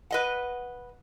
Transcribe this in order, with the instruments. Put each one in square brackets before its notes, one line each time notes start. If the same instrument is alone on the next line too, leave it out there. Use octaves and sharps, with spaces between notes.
[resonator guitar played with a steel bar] B4 D#5 F#5